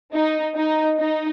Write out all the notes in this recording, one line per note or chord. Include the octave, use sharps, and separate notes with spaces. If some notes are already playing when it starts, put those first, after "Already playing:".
D#4
D#4
D#4